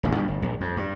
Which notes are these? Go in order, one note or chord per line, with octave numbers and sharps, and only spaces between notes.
D#1 A1 G2
G2 B2 D3 G3
G1
A#1
F2
G2